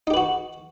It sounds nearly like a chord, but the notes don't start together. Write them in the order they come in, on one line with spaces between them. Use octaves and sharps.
D#4 G4 B4 F#4